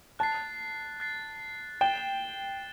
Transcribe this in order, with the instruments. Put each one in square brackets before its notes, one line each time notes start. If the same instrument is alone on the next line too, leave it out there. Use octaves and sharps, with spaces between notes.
[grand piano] A5 [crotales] F#6 A6 C7
[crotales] F#6 A6 C7
[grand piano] G5 [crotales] A6 E7 G7